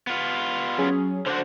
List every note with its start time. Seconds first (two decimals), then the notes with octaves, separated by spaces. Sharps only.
0.07 B3 F4
0.78 F#3 C#4 G#4
1.26 D3 D4 F#4 C5